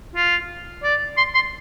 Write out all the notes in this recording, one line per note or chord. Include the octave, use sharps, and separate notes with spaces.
F4
D5
C6
C6